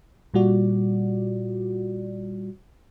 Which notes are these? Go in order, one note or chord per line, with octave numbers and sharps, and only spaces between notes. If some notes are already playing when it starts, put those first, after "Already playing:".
A#2 G3 F4 F#4 D5